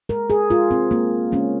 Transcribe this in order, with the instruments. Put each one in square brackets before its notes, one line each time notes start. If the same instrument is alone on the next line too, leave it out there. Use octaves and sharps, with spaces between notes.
[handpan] G#3 A#4
G#4
G#3 F4
C4
G#3 A#3
G#3 C#4